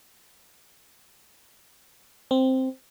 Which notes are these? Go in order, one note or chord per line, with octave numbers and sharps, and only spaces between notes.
C4